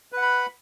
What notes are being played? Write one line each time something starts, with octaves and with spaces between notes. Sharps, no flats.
B4 F#5 B5